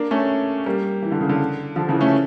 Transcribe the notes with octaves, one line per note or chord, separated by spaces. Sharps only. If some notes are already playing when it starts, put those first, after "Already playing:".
Already playing: A#3 D4
A3 C#4
G3 A#3
E3
D3
C#3
D3
D3 F3
C#3 E3
A3 C#4